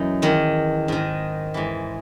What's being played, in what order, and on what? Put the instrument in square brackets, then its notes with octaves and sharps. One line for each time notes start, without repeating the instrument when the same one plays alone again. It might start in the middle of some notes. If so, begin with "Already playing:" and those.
Already playing: [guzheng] F#2 E3 D#4
E2 D#3
G#2 D#3
G#2 E3